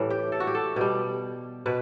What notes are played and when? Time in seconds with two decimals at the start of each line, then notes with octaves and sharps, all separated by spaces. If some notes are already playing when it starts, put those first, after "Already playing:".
Already playing: A2 E3 G3 A4
0.10 G4
0.32 A4
0.40 F#4
0.47 G4
0.55 A4
0.76 B2 G3 G4
1.66 B2 B4